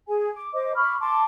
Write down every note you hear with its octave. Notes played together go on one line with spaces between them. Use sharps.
G#4 G#5
D6
C5 D#5 D6
B5 C#6 D6 F6
A5 C6 D6